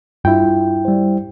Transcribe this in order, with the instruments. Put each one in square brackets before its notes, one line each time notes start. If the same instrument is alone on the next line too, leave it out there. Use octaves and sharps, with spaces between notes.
[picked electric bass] G2 [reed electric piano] E4 G5 [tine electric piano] F4
[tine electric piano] G3 C5